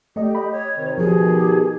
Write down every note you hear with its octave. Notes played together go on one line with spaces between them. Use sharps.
A3 G4 D5 D#5
D#5 B5
C#5
C3 D#3
B2 D#3 F3 G4 G#4